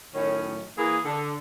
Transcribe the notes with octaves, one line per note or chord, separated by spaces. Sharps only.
F#2 A2 D#3 C#4
E3 A#3 G#4
D3